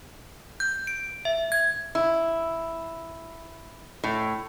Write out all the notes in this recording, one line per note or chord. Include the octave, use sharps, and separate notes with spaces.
G6
D7
E5
G#6
E4
A2